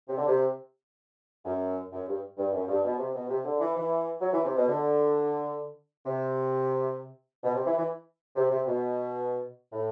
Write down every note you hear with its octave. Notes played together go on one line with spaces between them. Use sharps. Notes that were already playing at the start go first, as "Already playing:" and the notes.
C3
D3
C3
F#2
F#2
G2
G2
F#2
G2
B2
C3
B2
C3
D3
E3
E3
F#3
E3
C3
B2
D3
C3
B2
C3
E3
E3
C3
C3
B2
A2